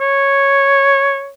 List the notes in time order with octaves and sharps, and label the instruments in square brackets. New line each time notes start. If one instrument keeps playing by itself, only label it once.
[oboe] C#5